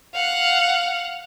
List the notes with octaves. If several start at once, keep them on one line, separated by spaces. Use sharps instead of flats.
F5 F#5